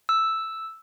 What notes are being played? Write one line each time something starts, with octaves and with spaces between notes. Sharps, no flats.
E6